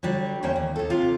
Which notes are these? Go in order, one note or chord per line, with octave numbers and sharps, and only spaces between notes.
D3 F#3 G3
E2 A#3 C#4 C#5 G5
D#2
D#2 A4
C3 F4